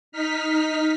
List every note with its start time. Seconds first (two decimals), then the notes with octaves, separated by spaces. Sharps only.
0.12 D#4 F6 B6